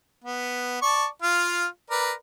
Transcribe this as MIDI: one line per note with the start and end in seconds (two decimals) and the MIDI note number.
0.24 0.80 59
0.82 1.06 74
0.82 1.06 81
0.82 1.06 85
1.22 1.66 65
1.22 1.66 77
1.90 2.12 70
1.90 2.12 71
1.90 2.12 74